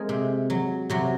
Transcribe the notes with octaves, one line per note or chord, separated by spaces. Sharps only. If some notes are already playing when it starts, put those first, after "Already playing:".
Already playing: G#3 A#3 C4 G#4 A#4
C3
F#3
C3 F#3 F#4